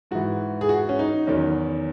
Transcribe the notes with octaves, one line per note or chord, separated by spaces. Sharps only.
G#2 E3 F#4
G#4
F#4
C#4
D#4
E2 D#3 F#3 C#4